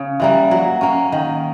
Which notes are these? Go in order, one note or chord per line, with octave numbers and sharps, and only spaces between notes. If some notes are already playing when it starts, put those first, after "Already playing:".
Already playing: C#3
E3 G3 A#3
F#3
A#3 C#4
D#3